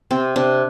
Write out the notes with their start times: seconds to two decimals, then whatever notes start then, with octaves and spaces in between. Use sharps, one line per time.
0.11 C3 C4
0.36 C3 D4